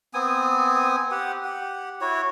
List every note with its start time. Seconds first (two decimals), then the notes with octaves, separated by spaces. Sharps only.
0.14 B3 C4 G#5 D#6
1.11 G4 F#5
1.45 G4 F#5
2.01 E4 F#4 C#5